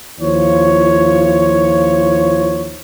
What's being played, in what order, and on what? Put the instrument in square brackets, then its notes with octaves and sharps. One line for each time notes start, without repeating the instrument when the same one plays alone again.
[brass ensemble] D#2 F3 E4 F4 C#5